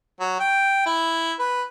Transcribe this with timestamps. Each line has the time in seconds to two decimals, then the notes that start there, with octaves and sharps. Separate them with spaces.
0.20 F#3
0.39 G5
0.86 E4
1.39 B4